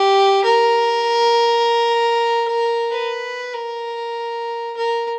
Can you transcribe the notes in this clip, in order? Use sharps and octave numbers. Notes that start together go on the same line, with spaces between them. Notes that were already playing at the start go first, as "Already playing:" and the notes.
Already playing: G4
A#4
B4
A#4
A#4